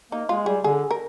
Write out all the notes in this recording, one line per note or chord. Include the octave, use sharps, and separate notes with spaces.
A#3 D#4
G#3 F4
G3 G#4
D3 G#4
A#4